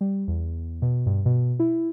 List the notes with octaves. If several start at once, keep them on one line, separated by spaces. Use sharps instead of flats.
G3
E2
B2
G2
B2
E4